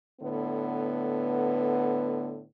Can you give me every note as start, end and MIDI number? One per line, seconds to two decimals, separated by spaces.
0.20 2.42 45
0.20 2.42 50
0.20 2.42 59